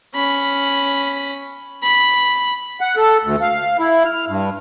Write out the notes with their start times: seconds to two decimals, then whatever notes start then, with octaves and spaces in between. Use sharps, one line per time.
0.15 C#4 B5
1.83 B5
2.81 F#5
2.97 A4
3.23 D2
3.41 F5
3.79 E4
4.05 F6
4.28 G2